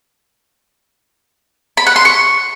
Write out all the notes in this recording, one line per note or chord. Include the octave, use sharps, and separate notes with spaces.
B5
F#5
C6
C#6